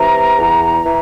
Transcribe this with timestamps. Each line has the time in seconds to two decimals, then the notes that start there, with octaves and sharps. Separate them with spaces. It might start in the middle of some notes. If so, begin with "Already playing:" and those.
Already playing: C3 E3 A#5
0.38 E2
0.83 E3